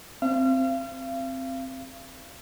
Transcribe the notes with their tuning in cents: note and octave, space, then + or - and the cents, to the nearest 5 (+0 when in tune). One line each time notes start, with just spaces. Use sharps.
C4 +0 F5 -35